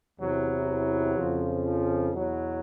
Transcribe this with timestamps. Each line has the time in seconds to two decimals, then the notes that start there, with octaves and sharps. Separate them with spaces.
0.19 E2 C3 E3 F#3
1.16 F2 C#3 F3
1.65 F3
2.12 E2 B2 F#3